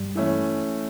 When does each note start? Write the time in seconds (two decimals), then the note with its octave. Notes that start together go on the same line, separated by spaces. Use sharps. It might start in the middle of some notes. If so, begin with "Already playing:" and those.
Already playing: G2 G3
0.15 E3 A3 C#4